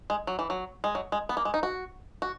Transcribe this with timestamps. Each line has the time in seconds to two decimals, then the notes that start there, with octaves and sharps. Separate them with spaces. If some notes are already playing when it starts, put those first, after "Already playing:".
0.10 G#3
0.27 F#3
0.39 E3
0.50 F#3
0.84 G#3
0.95 F#3
1.12 G#3
1.29 B3
1.37 A#3
1.45 G#3
1.54 D#4
1.63 F#4
2.22 F#4